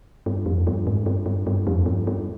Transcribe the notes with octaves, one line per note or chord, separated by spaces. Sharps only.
G2
F2
G2
G#2
G2
G2
G2
F2
G2
G2